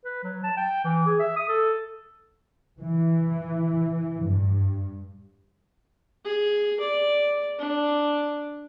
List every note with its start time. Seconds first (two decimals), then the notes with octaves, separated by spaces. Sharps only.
0.05 B4
0.24 F#3
0.43 A5
0.57 G5
0.85 E3
1.06 G#4
1.20 E5
1.36 D#6
1.49 A4
2.80 E3
4.22 G2
6.25 G#4
6.80 D5
7.58 D4